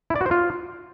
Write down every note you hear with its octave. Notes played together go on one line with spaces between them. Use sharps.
E4
D5
F#4
C5
F4